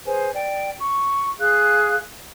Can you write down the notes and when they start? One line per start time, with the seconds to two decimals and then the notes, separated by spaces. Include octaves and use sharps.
0.06 G#4 B4 C5 G#5
0.34 D5 G5
0.80 C#6
1.39 G#4 F5 F#6